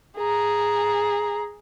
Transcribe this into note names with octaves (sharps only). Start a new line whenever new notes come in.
G#4 A#5